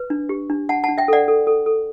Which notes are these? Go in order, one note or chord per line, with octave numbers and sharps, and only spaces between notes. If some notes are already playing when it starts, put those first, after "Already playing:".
Already playing: B4
D4
G4
D4
D4 F#5 A5
F#5 A5
D4
E5 G5
A4 D5 F#5
A4
A4
A4